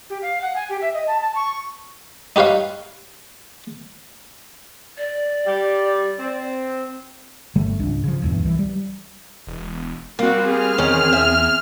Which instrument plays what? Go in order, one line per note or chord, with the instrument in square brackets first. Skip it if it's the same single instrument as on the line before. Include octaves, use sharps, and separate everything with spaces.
[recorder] G4
F5
F#5
G#5
G4
E5
D#5
A5
A5
C#6
[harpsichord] D#4 G4 B4 C#5 F5
[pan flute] D5
[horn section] G3 G4
C4
[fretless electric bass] G1 D3 G3 A3
G#1 C#2 D4
C#3 F3
D#1 E2 G2
C2 E3
G3
[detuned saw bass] E1
[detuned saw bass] G3 [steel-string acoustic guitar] A#3 [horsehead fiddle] C4 F#4
[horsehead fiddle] C4 G#4 [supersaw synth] F6
[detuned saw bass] E2 [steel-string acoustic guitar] D#3 C#4
[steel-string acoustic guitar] E5